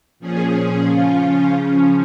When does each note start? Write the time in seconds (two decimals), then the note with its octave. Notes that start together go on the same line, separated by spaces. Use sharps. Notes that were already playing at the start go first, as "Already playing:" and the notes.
0.19 A#2 F3 C#4 G#4
0.86 C#3 F3 C#4 F4
1.52 C#3 F3 C#4